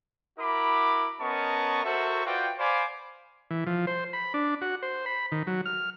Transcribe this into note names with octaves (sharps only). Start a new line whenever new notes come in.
E4 F#4 A#4 B5 D6
B3 C#4 A#4 D#5 A5 C#6
F#4 A4 A#4 C5 E5 C#6
F4 F#4 B4 D5 G5
C5 D5 F5 G#5 B5 D6
E3
F3
C5
B5
D4
F#4
C5
B5
D#3
F#3
F6